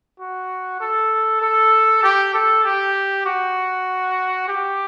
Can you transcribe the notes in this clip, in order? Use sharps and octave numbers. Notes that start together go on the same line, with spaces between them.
F#4
A4
A4
G4
A4
G4
F#4
G4